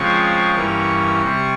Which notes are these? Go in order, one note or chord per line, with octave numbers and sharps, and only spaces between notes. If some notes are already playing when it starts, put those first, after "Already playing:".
Already playing: C#3 F3 G#3 C4 C#6
G2 E3 A#3 C#4
C3 G3 C4